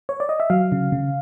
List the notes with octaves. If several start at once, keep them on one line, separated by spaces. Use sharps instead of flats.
C#5
D5
D#5
E5
F#3 F5
C#3
C#3